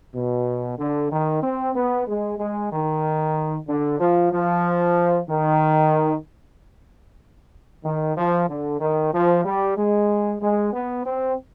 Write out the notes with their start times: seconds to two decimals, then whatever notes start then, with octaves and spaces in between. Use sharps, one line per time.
0.14 B2
0.79 D3
1.11 D#3
1.43 C4
1.75 B3
2.07 G#3
2.39 G#3
2.71 D#3
3.68 D3
4.00 F3
4.32 F3
5.28 D#3
7.84 D#3
8.17 F3
8.49 D3
8.80 D#3
9.13 F3
9.45 G3
9.77 G#3
10.41 G#3
10.73 B3
11.05 C4